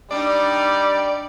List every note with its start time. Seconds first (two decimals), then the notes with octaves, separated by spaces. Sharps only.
0.11 G3 D4 D#4 D5